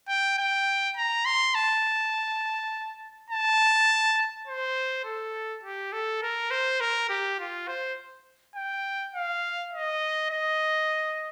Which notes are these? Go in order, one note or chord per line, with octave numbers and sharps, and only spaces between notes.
G5
G5
A#5
C6
A5
A5
C5
A4
G4
A4
A#4
C5
A#4
G4
F4
C5
G5
F5
D#5
D#5